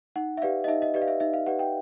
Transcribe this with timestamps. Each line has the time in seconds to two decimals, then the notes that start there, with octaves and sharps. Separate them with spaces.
0.16 D#4 F#5
0.37 E5
0.42 G4 B4 D5 F5
0.64 D#5
0.68 D#4 E5
0.82 D#5
0.94 G4 B4 D5 D#5
1.02 F5
1.08 E5
1.20 D#4 E5
1.34 F5
1.47 G4 B4 D5 F#5
1.59 G5